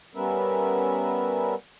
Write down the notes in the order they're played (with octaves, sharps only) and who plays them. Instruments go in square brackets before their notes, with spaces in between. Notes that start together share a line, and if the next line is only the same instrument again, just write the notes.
[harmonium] G3 B3 C#4 A#4 B4 E5